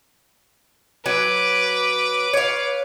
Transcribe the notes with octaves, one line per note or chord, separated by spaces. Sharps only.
F#3 B4 D6
C#5 F5